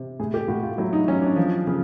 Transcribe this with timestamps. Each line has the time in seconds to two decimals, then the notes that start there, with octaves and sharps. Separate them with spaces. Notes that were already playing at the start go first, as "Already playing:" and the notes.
Already playing: C3
0.20 A2 G#4
0.34 G4
0.48 A2 F#4
0.63 F4
0.78 F#3 E4
0.93 D#4
1.08 F#3 C#4
1.22 D4
1.36 F3
1.67 C#3